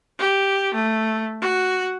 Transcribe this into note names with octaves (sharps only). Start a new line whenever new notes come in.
G4
A3
F#4